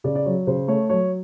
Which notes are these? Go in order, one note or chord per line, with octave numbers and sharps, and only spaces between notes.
C#3 D5
D5
F#3 C#5
C#3 C5
A3 C#5
F#3 C#5